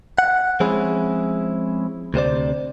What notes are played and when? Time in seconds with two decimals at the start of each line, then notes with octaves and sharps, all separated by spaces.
0.18 F#5
0.60 F3 G#3 C4 C#4 E4 G#4
2.14 D2 C3 C5 D5